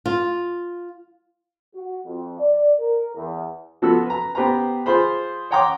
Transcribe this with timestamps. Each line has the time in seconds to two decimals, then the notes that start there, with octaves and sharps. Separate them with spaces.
0.06 F4
1.74 F#4
2.05 F2
2.39 D5
2.79 A#4
3.15 E2
3.82 F3 B3 F#4 A4 E6
4.06 B4 A#5
4.35 B3 G4 B4 C5 A#5
4.86 F4 G#4 C5 B5
5.51 C#5 F#5 G5 A#5 C6 D6